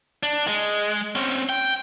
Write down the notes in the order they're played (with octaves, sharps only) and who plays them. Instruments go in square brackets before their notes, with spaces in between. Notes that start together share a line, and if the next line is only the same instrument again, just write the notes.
[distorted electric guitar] D4
G#3
C4 C#4
G5